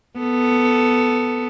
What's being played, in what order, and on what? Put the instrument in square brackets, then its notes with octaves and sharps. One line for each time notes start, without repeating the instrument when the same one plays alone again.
[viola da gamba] B3 A4